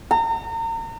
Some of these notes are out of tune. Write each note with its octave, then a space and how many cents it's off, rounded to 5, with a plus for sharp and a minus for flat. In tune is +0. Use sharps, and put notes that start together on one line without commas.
A#5 -35